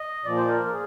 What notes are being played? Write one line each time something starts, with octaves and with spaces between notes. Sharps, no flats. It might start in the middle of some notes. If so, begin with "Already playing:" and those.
Already playing: D#5
A#2 F3 D5
C5
A#4
A#4
G#4